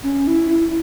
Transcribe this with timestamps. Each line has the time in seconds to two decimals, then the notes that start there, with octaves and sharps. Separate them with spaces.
0.04 C#4
0.27 E4
0.50 E4